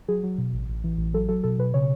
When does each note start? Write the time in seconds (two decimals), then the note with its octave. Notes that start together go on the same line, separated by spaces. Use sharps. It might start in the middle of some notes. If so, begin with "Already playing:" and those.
0.08 F#3 G#4
0.23 F#3
0.38 B2
0.54 A1
0.69 A1
0.84 E3
0.98 A1
1.14 F#3 A4
1.29 F#3 A4
1.43 B2 A4
1.58 B2 B4
1.74 C#3 C#5